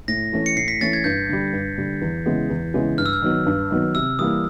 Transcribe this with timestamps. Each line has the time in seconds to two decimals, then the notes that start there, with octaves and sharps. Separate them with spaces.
0.08 A2 A#6
0.32 E3 A3 C#4
0.46 C#7
0.57 A2 C7
0.68 B6
0.81 E3 A3 C#4 A6
0.93 G#6
1.04 G2 G6
1.29 D3 G3
1.53 G2
1.78 D3 G3
2.01 E2
2.26 C#3 E3 G#3 B3
2.50 E2
2.74 C#3 E3 G#3 B3
2.98 G2 F6
3.06 E6
3.13 F6
3.22 D#3 F#3 B3
3.46 G2
3.71 D#3 F#3 B3
3.95 C3 E6
4.19 E3 G3 A#3 D#6